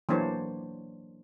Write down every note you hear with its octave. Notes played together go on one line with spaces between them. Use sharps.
E3 F#3 A#3 D4 C5 C#5